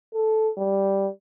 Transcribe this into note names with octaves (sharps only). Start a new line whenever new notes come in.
A4
G3